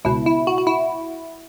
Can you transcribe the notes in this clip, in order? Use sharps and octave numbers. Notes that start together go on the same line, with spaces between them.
C#2 B2 E4
E4
F#4
F#4
E4